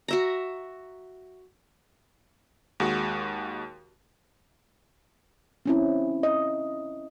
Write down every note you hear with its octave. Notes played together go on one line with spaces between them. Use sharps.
F#4 E5 A#5
D#2 G#3 F#4
C4 C#4 E4
D#5